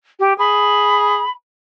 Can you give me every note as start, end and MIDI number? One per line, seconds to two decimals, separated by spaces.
0.20 0.34 67
0.39 1.22 68
0.39 1.30 83